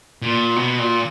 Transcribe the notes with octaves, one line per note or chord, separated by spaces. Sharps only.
A#2
B2
A#2